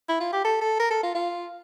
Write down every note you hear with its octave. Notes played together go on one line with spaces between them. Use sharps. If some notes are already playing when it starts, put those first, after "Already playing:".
E4
F4
G4
A4
A4
A#4
A4
F4
F4